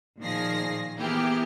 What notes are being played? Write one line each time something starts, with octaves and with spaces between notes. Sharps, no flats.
A#2 D#3 F3 G#4 A#6 C7
E3 A#3 B3 E4 G4 G#4